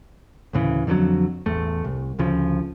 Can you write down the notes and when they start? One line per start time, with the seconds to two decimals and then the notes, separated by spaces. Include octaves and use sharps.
0.53 D2 A2 C#3 E3
0.87 F2 D3 D#3 F#3
1.46 A1 E2 A3
1.85 C2
2.19 D2 C#3 F3